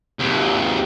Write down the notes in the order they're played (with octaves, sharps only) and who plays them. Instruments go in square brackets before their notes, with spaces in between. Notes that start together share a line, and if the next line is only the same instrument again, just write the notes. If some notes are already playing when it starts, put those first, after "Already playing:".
[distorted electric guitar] D#2 C3